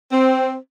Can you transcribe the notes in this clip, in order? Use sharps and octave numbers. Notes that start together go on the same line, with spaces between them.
C4